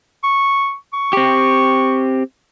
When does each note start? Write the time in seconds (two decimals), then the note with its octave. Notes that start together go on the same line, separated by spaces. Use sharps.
0.23 C#6
0.93 C#6
1.13 C4 G4